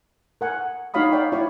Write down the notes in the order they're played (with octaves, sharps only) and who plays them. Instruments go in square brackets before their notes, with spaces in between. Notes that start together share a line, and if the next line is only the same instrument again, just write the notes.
[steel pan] A#4 F#5 G#5
D#4 F#4 C#5 F5 B5 D#6
C#5 D5 F5 G5
E4 F#4 C#5 D5